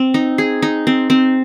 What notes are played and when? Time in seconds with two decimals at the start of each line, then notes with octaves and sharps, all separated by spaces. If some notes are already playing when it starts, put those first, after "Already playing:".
Already playing: C4
0.14 D#4
0.38 G#4
0.62 D#4
0.87 C4
1.10 C4